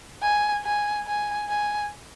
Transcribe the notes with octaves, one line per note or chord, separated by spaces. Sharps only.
G#5
G#5
G#5
G#5